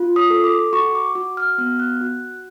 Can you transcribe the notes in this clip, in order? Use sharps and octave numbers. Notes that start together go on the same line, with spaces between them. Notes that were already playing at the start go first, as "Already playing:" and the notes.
Already playing: F4
D#6
A4
D6
F#4 C#6
D6
F#4
F6
B3 F6
F#6
F#4 F#6